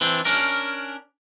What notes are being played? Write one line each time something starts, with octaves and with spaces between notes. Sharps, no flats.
E3 C4 D4
C#4 D4 A#4